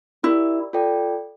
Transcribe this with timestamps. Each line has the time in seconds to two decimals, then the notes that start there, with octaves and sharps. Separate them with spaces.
0.23 E4 G4 A#4 D5
0.73 F4 A4 D5 G5